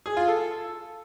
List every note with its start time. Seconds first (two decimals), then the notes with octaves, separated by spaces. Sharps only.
0.06 G#4
0.17 F4
0.28 A4